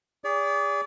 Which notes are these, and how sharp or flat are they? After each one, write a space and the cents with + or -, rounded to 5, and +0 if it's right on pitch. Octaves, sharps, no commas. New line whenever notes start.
G#4 -35 D5 -35